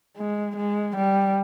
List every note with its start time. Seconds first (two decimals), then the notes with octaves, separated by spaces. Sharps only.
0.17 G#3
0.57 G#3
0.97 G3